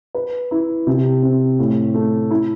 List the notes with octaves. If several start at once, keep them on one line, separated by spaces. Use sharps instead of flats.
B4
E4
C3
C4
A2
A3
E4